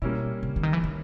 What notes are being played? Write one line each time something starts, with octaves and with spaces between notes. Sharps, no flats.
B2 G3 A#3 C#4 E4
C3
D3
D#3
E3
D#3